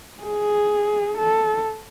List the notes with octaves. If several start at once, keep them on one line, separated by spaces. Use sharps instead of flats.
G#4
A4